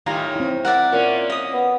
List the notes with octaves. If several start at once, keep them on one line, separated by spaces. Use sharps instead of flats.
A2 D#3 G3 F4 G#5 A#5
C4 E4
A#4 D5 E5 F#5
A#2 A#3 C#4
D#5 D#6
B3